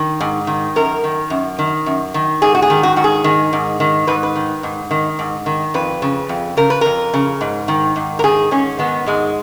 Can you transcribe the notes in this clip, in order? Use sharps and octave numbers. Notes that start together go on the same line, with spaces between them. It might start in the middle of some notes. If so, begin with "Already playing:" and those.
Already playing: D#3
G#2
D#3
F#2 A#4
D#3
F#2
D#3
F#2
D#3
G#2 G#4
F#4
G#4
D#3
F#4
G#2 F#4
G#4
D#3
G#2
D#3
G#2 B4
B4
D#3
G#2
D#3
G#2
D#3
F2 B4
C#3
F2
C#3 A#4
B4
F2 A#4
C#3
G#2
D#3
G#2
A#4
D#3 G#4
G#2 C#4
D#3 B3
G#2 G#3